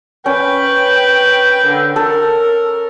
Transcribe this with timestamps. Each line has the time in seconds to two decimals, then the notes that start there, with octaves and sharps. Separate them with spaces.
0.26 C#4 B4 G5
1.65 D3
1.96 A4 A#4 A#5